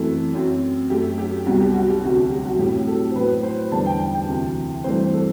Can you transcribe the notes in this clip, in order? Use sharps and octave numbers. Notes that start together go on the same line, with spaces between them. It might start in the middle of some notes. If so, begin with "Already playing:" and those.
Already playing: F#2 E3 A3 C4 A4
F#2 F#3 C4
F#2 F#3 A3 G4
G4
C2 B2 F#3 F#4
G4
F#4
G4
D2 C3 F#3 C4 F#4
G4
G4
F#4
A2 F#3 C4 G4
A4
C5
A2 F#3 B3 B4
C5
E2 D3 G3 B3 A5
G5
G5
G5
D2 C3 E3
G2 E3 A3 C4 C5
A4